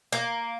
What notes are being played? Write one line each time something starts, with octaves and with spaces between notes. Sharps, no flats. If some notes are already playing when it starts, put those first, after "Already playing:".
A#3